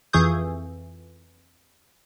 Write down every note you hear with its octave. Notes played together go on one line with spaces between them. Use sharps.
F2 E3 G#4 C#6 D#6 G6